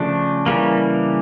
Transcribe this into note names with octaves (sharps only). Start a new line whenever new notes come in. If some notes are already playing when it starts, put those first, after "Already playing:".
Already playing: C#3 F3 A3 D4
C#3 E3 G3 A#3